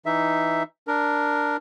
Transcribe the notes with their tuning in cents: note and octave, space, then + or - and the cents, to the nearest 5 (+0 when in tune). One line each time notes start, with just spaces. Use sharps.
E3 +0 D#4 +0 E5 +0
D4 +0 A#4 +0